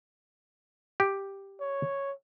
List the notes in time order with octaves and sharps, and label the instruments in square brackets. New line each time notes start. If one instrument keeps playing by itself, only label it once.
[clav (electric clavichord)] G4
[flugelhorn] C#5